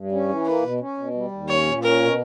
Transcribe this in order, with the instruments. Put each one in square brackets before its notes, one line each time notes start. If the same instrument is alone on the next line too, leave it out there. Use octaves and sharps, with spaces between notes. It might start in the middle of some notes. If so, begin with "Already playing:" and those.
Already playing: [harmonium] G2
C#4
E3
[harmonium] A#3 [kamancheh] B4
[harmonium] B2
C#4
B2
G3
D#2
[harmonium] C#4 [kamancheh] C#5
[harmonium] A#2
[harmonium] C#4 [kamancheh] A#4
[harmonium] B2